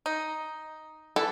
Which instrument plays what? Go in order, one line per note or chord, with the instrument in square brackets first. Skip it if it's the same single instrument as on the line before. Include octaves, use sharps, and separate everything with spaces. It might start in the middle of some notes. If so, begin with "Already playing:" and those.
[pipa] D#4
[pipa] E3 E4 [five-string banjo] A4